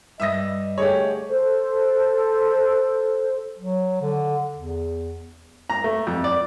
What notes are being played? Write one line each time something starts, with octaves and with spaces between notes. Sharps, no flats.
G2 G3 D#5 E5 D#6 A#6
D3 A3 G4 G#4 C#5
A4 C5
F#3
D3
E2
A#5
A3
F2
D5